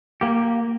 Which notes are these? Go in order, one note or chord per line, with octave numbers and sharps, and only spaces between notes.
A#3 G4